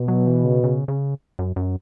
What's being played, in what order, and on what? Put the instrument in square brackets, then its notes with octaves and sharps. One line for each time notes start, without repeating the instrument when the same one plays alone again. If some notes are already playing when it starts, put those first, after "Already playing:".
Already playing: [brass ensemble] B2
[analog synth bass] F#3
E3
C#3
C#3
C#3
F#2
F#2